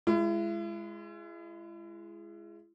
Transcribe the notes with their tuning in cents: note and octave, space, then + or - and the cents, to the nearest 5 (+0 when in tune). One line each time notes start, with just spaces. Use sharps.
G#3 +0 E4 +40